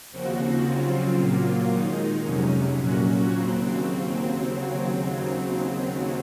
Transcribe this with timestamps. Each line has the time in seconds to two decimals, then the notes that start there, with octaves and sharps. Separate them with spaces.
0.12 D#2 C#3 F3 C4 F#4
0.64 C#3 F#3 C4 F4
1.17 A#2 F#3 A#3 F4
1.70 D#3 G#3 D#4
2.23 F2 C3 F#3 C#4
2.76 A#2 F#3 C#4 F#4
3.29 D#2 C#3 F#3 C4